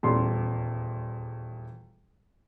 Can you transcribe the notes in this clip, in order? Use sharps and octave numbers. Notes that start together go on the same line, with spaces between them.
D#1 E2 G3 C#4 D5 C6